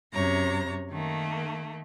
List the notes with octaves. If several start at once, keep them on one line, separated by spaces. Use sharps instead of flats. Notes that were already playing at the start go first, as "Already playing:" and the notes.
F#2 C3 C#5 A#5
D#3 A3 A#3